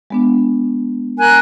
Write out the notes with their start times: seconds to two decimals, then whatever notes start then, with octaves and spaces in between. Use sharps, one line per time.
0.10 G#3 B3 D4
1.19 A#4 G#5 F#6